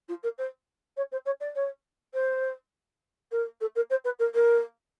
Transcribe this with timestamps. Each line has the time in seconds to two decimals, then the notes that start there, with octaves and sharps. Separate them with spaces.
0.08 F4
0.23 A#4
0.38 C5
0.96 C#5
1.11 C5
1.25 C#5
1.40 D5
1.55 C#5
2.13 C5
3.31 A#4
3.60 A4
3.75 A#4
3.90 C5
4.04 B4
4.19 A#4
4.34 A#4